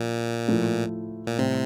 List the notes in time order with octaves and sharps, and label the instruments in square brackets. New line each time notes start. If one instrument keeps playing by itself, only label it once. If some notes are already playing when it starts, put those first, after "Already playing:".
Already playing: [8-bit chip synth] A#2 [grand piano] F3
[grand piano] A2 F3 A3 E4
[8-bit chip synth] A#2
[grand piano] A2 G3 C4 [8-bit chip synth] C3